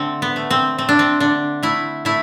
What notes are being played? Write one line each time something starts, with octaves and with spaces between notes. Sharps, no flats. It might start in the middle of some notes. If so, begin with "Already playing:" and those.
Already playing: D3 A3 C4
B3
A3
C4
A3 C4
D4
C4
D3 D4
A3 E4
A3 E4